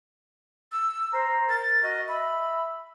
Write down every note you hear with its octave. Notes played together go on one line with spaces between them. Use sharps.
E6
C5 A#5
A#4 A6
F#4 D#5
E5 B5